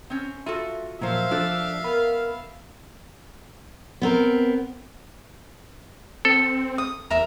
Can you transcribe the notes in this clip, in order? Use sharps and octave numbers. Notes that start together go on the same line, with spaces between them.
C4 C#4
F4 F#4 A4 E5
A#2 F3 F#3 C5 E5 F5
F3 D4 A4 F#6 A6
B3 A#4 B5 F6
B3 C4 A#4
C4 A4
D#6
E2 A#4 E5 A#5